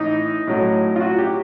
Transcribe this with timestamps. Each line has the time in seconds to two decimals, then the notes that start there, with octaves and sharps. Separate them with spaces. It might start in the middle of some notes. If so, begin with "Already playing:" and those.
Already playing: A2 E3 D#4
0.47 A2 F#3
0.96 F4
1.01 F#4
1.18 G4